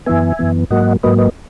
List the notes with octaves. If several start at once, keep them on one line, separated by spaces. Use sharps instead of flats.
F#2 E3 B3 E5 G#5
F#2 E3 B3
G#2 F#3 A#3 D#5 F#5
G#2 F#3 A#3 B4 D#5
B4 D#5